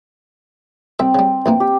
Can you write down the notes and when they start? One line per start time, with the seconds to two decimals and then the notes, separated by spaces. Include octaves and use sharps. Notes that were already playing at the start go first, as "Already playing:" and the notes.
0.99 C2 C4 E5
1.15 C#3 G3
1.46 A#1 E3 A#3
1.60 G4